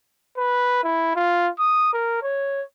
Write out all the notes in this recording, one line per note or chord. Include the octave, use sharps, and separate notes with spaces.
B4
E4
F4
D#6
A#4
C#5